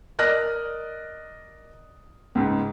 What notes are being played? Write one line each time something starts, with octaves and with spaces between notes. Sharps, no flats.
A#4 D5 D#5 F6 F#6 A#6
C#2 G#2